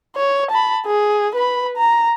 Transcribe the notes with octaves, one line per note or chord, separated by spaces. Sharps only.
C#5
A5 B5
G#4
B4 B5
A#5